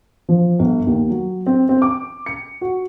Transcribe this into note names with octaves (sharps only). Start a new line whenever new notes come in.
F3
G1
D#2
F#3
C4
C4
D6
C#7
F#4